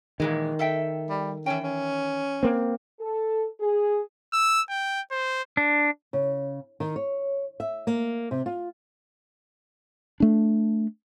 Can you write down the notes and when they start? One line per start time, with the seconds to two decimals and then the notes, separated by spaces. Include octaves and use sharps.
0.20 A#2 D#3 E3 G#3
0.59 A4 E5 G5
1.10 G3
1.46 E3 C#4 G5
1.64 C#4
2.43 A#3 C4
3.00 A4
3.60 G#4
4.33 E6
4.69 G5
5.11 C5
5.57 D4
6.13 C#3
6.80 D#3
6.96 C#5
7.60 E5
7.87 A#3
8.31 C3
8.46 F4
10.20 A3 D4